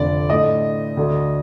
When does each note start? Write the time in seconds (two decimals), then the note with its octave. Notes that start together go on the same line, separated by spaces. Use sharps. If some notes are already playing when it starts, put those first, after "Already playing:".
Already playing: F1 F2 D3 D5
0.30 A2 A3 D4 D#5
0.97 D2 D3 A3 D4